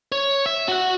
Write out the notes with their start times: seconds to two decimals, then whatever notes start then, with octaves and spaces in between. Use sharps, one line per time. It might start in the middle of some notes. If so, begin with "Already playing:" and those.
0.12 C#5
0.46 E5
0.68 F#4 F#5